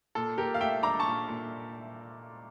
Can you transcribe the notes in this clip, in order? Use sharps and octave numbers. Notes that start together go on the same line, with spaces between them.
A#2 A4
A#2 G4 A#4
F5
A3 E5 G5
D4 A#5 D6
A5 C#6
A#2
A#2